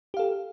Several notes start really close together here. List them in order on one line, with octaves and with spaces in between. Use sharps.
G4 F5 A4